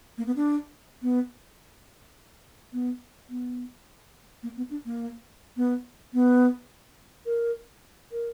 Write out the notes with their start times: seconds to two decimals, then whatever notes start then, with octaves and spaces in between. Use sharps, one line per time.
0.18 A#3
0.27 B3
0.36 D4
1.02 B3
2.73 B3
3.29 B3
4.43 A#3
4.57 B3
4.70 D4
4.86 A#3
5.57 B3
6.13 B3
7.26 A#4
8.12 A#4